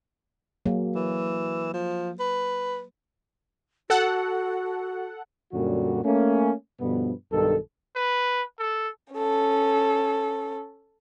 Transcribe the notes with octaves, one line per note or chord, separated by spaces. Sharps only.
F#3 A#3 G#4
E3
F3
B4
F#4 A4 F#5
F#2 A#2 D3 F#3 G3 F#4
A3 A#3 C#4
G2 B2 D3 F3 B3
B1 G2 D#3 A4
B4
A4
C#4 A4